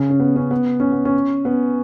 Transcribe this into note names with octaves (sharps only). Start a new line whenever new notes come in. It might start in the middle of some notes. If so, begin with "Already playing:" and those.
Already playing: C#3
C#4
B3
C#4
B3
C#4
B3
C#4
B3